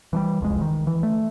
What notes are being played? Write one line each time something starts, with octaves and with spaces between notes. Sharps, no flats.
E3 F#3 G3
D1 C2 F2 G#3
D#3
E3
A3